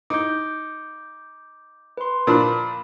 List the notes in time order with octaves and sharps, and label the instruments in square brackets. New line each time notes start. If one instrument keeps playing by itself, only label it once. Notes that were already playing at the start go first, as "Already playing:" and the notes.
[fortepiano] D#4 [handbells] D6 G6
[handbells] B4 C6
[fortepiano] A#2 F3 D4 [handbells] B5